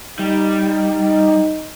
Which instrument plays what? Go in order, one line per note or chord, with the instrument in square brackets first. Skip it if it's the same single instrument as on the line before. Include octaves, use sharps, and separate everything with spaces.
[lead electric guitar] G3 [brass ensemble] D#4